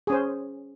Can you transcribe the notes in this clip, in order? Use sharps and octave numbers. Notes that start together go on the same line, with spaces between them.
C#4 G#4 C5